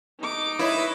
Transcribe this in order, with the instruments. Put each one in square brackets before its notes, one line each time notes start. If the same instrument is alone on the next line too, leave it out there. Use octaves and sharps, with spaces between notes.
[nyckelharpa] D#4 D6
[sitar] E4 [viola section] B4 C#5 D#5